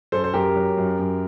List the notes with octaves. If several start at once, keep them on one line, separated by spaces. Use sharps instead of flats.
F#2 A4 C5
C5
F#2 G4 A#4
F#3
F#2
F#2